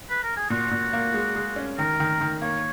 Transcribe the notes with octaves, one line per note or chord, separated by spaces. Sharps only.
B4
A#4
G#4
A#2 F#4
A#2
A#3
G#3
G#3
C#4
D#3 A#4
D#3
D#3
A#3 C#5